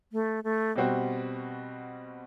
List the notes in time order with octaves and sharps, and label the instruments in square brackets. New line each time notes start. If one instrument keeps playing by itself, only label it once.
[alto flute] A3
A3
[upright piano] B2 G3 C4 F#4